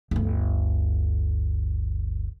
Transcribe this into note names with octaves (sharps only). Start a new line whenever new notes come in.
G1 D2